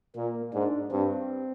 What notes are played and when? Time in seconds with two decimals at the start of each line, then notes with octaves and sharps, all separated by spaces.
0.16 A#2 A#3
0.53 G#2 D4
0.91 G2 C4